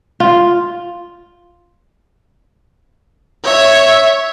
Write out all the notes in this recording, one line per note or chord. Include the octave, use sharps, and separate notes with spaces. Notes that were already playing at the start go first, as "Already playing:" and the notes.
F4
C#5 E5